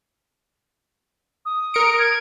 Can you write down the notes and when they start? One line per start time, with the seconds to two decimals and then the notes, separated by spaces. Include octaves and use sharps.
1.46 D#6
1.74 A#4 C#7 D7
1.99 G#6